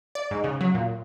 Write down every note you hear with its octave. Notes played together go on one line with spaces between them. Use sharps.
D5
G#2
C#3
F#3
A#2